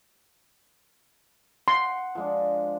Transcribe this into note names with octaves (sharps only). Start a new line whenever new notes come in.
F#5 C6
F3 G#3 D4